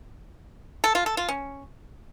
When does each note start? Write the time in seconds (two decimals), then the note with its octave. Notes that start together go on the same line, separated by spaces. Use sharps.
0.84 A4
0.95 F4
1.06 A4
1.17 F4
1.28 C#4